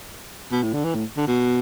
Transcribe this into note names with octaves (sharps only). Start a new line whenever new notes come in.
B2
A2
D3
E3
A2
D3
B2